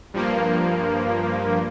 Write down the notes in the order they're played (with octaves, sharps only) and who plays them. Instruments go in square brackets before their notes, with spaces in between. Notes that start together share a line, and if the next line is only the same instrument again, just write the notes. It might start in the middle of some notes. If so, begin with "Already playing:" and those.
[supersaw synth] G2 F3 A#3